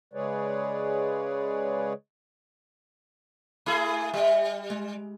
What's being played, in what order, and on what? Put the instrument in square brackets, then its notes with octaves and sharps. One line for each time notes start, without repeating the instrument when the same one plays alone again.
[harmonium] C#3 G#3 G#4 B4 C#5 D5
[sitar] A3 E4 G#4
[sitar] G3 [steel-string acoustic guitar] E5 G5
[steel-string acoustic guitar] G#3